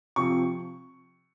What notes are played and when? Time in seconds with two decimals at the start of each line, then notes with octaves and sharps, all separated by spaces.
0.16 C3 F3 C#6